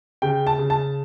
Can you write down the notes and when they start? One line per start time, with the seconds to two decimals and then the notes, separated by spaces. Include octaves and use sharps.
0.22 C#3 G5
0.47 A5
0.59 C#3
0.70 A5